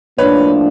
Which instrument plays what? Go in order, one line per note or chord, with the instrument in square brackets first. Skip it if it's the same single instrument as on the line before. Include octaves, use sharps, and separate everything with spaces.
[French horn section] A2 F3 A#3 D4 [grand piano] B4 C#5